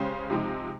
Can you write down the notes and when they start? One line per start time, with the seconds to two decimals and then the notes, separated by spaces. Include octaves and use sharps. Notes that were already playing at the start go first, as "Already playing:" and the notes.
Already playing: C#3 G#3 C#4 G4 C5
0.30 C3 F3 G#3 C4 D#4